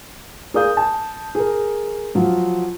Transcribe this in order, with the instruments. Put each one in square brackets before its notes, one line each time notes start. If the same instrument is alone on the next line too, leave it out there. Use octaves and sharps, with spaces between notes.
[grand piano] G#4 A#4 D5 F5 D#6 G6
A5
G#4 A#4
F3 F#3 F4